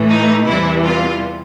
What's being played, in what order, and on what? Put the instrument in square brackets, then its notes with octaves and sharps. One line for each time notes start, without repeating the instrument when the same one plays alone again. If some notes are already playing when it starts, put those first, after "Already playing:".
Already playing: [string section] A2 E3 A3
D#4
E2 C3 E3 G3 E4
F4